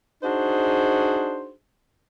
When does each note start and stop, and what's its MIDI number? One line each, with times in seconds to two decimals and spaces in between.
0.23 1.52 62
0.23 1.52 63
0.23 1.52 66
0.23 1.52 68
0.23 1.52 72